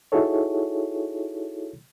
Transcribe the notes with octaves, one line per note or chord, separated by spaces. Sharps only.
D#4 E4 F#4 G#4 A4 C#5